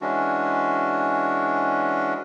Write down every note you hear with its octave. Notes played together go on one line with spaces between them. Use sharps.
E3 G#3 C#4 D4 F#4